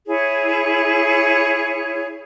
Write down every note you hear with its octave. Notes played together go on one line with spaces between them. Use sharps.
E4 G#4 C#5